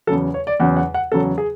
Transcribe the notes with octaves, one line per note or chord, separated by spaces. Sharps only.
E2 C#3 F#3 A4
C#5
D5
E2 C#3 F#3 F#5
F#5
F#5
E2 C#3 F#3 A4
G#4